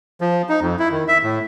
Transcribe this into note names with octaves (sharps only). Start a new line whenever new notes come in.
F3
D#4
F2
E4
D#3
E5
A2